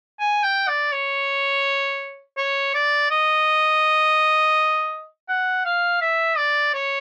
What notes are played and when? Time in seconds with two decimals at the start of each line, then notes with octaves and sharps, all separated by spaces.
0.20 G#5
0.44 G5
0.68 D5
0.93 C#5
2.38 C#5
2.74 D5
3.11 D#5
5.29 F#5
5.65 F5
6.02 E5
6.37 D5
6.74 C#5